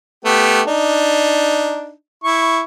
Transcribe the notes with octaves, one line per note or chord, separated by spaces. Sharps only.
A3 B3 G4
D4 D#4
E4 C#6